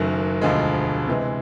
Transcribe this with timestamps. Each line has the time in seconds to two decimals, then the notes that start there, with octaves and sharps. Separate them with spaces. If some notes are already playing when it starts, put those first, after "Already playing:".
Already playing: F#1 F#2 D#3 F#3 A3
0.42 E1 D2 D3 F3 G#3
1.07 C3 E3 G#3